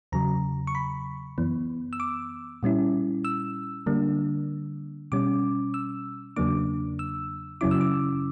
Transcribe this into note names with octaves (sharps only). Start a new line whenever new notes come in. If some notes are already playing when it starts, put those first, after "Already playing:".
E2 C#3 F#3 A#5
C#6
B5
F#2 E3 B3
E6
D6
A#2 G3 C#4 E4
E6
D3 G3 A#3 D4
B2 G3 C#4 D6
E6
E2 C#3 F#3 A#3 D4 D6
E6
F#2 C#3 F#3 C#4 E4 D6
E6
D6